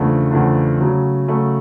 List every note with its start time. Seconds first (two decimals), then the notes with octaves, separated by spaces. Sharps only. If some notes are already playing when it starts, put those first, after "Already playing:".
Already playing: E2 C#3 F3 A3 D4
0.31 E2 C#3 F3 A3 D4
0.80 C#3 F#3 A3 C#4
1.28 C#3 F#3 A3 C#4